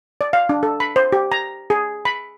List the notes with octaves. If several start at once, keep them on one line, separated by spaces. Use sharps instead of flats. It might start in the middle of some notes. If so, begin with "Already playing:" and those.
D5
F5
D4
A4
B5
C5
G4
A#5
G#4
B5